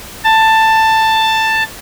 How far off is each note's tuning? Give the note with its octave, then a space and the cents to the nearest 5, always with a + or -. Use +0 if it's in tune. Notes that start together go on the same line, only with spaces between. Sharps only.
A5 +10